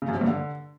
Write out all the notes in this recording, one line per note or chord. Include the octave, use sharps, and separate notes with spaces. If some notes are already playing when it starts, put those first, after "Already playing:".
C#3
F#2
C3
G2
D3